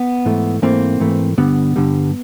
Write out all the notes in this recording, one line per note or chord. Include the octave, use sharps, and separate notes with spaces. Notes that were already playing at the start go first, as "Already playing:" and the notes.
Already playing: B3
G#2 E3 A3
G#2 E3 A3 A#3 C4
G#2 E3 A3
G2 D3 G3 B3
G2 D3 G3